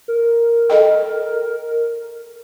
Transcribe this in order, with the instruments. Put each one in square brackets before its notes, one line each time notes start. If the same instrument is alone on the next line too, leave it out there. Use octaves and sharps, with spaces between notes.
[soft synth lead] A#4
[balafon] A4 D#5 G5